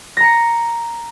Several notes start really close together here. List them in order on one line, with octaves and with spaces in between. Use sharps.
A#6 A#5 C#7